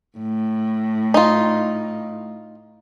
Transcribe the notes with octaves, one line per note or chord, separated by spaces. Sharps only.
A2
D#4 F4